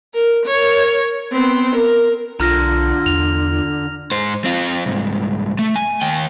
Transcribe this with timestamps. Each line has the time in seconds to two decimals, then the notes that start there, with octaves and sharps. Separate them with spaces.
0.14 A#4
0.46 A#4 C#5
1.32 B3 C4
1.76 A#4
2.40 B1 D3 F4 A#5 F6 A#6
3.06 E2 F7
4.11 G#2 C5
4.45 C4 F4
4.86 C2 G#2
5.59 A3
5.76 G#5
6.02 D#2 G5